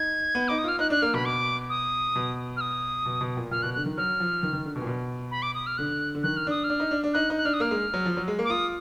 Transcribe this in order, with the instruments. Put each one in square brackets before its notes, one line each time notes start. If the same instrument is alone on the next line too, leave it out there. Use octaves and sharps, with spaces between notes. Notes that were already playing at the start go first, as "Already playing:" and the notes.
Already playing: [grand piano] D#4 [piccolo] G#6
[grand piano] B3
[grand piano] D#4 [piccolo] D6
[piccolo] D#6
[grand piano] F4 [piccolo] F6
[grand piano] D#4 [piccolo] F#6
[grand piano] D4 [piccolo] F#6
[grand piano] A#3 [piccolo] F6
[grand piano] B2 [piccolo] B5
[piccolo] D6
D#6
[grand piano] B2
[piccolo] F6
D#6
[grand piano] B2
B2
A#2
[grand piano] A#2 [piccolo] F6
[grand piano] B2 [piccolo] F#6
[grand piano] D3 [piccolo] F#6
[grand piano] D#3
[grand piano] F#3 [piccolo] F6
[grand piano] F3
D#3
D#3
D3
B2
A#2
B2
[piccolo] B5
D6
D#6
F6
[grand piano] D3 [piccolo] F#6
[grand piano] D3
[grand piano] D#3 [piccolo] F#6
[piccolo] F6
[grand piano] D4 [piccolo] D#6
[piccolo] F6
[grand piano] D4
D#4
D4
D4
[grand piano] D#4 [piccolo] F#6
[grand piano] D#4
[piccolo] F#6
[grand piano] D4 [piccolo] F6
[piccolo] D#6
[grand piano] A#3 [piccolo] F6
[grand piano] G#3
F#3
F3
F#3
G#3
A#3
[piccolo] D6
[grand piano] F4 [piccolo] D#6